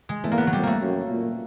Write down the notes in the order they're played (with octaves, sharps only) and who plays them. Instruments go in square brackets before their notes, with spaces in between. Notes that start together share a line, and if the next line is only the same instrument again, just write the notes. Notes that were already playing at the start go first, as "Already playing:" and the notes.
[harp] G#3
[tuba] E2 [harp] A3
[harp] A#3
B3
F#3
[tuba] F2 [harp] G3
[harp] A3 A#3
[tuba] F#2
A#2